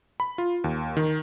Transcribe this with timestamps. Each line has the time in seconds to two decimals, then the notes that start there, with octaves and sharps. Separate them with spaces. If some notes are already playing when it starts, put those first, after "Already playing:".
0.20 B5
0.38 F4
0.64 D#2
0.97 D#3